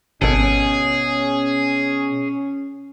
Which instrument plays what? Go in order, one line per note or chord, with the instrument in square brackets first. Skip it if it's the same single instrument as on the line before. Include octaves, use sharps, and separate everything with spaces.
[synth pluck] G#1 A4 [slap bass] B2 [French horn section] C#4 [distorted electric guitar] G#4